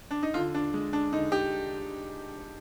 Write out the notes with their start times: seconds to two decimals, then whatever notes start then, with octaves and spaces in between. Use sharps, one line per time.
0.11 D4
0.23 D#4
0.34 D3 F4
0.55 D4
0.74 G#3
0.93 D4
1.13 D3 D#4
1.32 G4